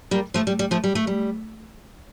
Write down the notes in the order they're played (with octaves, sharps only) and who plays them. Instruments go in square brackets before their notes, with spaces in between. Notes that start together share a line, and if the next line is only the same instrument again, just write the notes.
[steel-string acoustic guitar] G3 A#3
F3 A3
G3
G3
F3 A3
G3
A3
G3